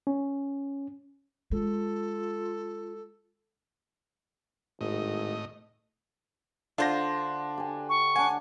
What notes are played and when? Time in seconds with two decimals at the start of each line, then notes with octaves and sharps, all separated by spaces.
0.07 C#4
1.51 G#3 F4 A4
4.81 G#1 A2 D#5
6.78 D3 D4 F4 C5 A#6
7.58 G4 G#5
7.89 C#6
8.16 D4 F#5 G#5